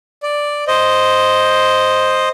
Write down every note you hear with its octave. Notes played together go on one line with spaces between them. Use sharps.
D5
C5 D#5